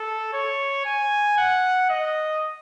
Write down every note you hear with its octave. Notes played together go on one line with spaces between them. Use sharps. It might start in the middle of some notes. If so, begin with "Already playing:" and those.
Already playing: A4
C#5
G#5
F#5
D#5